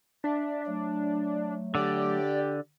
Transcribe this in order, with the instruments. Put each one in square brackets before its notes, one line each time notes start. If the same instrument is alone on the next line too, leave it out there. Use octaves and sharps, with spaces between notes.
[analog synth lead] D4 [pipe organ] D5 E5
[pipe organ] F#3 A3
[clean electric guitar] D3 [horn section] G4 [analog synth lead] D5